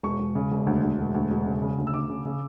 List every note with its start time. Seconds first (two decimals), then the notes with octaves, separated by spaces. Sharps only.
0.03 E1 C#6
0.19 E1
0.35 C#3
0.51 E1
0.67 D2
0.83 D2
0.99 E1
1.15 D2
1.30 E1
1.46 C#3
1.62 C#3
1.78 D2
1.87 E6
1.94 D2 D6
2.10 C#3
2.25 C#3